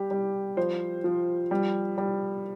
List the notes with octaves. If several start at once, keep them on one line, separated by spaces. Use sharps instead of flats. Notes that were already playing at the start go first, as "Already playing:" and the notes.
Already playing: G3 G4
G3
F3 C5
F3
G3
G3